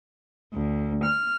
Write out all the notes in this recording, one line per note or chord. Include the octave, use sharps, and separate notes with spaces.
D2
F6